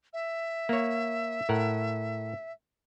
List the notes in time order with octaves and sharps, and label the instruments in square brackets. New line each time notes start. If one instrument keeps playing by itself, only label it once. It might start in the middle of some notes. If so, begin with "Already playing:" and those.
[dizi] E5
[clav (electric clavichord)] A#3 C#5
A2 A#4 F#5